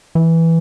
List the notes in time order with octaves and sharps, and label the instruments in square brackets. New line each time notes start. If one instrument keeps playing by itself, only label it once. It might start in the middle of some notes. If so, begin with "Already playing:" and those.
[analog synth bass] E3